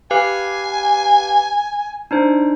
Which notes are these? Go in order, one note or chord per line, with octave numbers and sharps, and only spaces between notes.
G4 B4 F5 G#5
D4 D#4 C5